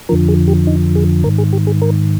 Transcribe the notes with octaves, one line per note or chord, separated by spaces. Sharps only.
F2 D3 F3 A#4
G#4
G4
D#4
G#4
G#2 D#3 A#4
G#4
G4
G#4
A#4